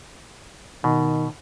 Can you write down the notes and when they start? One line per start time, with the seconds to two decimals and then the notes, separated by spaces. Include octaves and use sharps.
0.84 B2 D#3